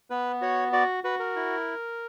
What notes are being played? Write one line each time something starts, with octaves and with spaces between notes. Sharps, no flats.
B3 B4
F#4 C#5
F#4 D5
F#4 B4
A#4
E4